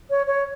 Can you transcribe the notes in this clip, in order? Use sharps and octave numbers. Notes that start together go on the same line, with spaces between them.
C#5
C#5